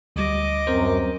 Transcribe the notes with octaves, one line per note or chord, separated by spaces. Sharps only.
D2 G3 D#5 D6
F#2 C4 A#4 C5